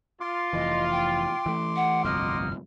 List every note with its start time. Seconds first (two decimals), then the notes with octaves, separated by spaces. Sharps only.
0.21 F4 C6 D6
0.53 F1 E3 D#5
0.91 G5
1.46 E3 A3
1.76 F#5
2.05 G1 C2 F2 A#3 F#4 D#5 F6